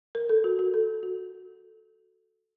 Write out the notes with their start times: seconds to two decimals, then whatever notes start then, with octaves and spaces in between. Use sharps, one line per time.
0.15 A#4
0.29 A4
0.44 F#4
0.59 F#4
0.74 A4
1.03 F#4